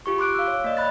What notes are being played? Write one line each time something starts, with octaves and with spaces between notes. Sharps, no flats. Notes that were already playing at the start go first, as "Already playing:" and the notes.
F4 G4 C#6
C6 D6 F#6 D7
F5 E6
C#5
A#3 D5 D#5
D5 D#5 B5 F#6 A6